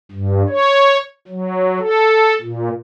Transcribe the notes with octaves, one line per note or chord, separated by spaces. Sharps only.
G2
C#5
F#3
A4
A#2